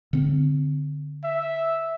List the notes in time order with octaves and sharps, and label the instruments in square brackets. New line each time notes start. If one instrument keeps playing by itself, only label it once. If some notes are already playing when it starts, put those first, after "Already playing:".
[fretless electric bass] D3 C4
[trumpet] E5